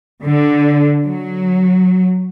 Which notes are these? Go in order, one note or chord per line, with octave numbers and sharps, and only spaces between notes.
D3
F#3